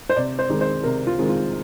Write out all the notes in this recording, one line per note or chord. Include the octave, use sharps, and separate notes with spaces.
C5
C3 D5
C5
D#3 G#3 C4
C5
C3 A#4
F4
D#3 G#3 C4
F4